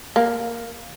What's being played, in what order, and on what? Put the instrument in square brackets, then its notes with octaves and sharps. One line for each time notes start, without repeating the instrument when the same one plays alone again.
[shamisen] A#3